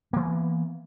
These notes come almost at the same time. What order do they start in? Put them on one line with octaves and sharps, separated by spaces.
A#3 E3 B3